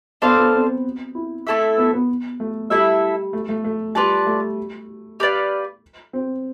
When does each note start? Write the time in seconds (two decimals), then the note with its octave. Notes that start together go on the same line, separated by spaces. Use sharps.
0.22 B3 D4 A4 C5 F5
0.38 B3
0.53 C4
1.15 E4
1.47 A3 E4 A4 E5
1.78 B3
1.93 B3
2.40 A3
2.70 G3 E4 A4 E5
3.33 A3
3.49 A3
3.64 A3
3.95 G3 F4 B4 D5 A5
4.27 A3
5.20 G4 B4 D5 F5
6.13 C4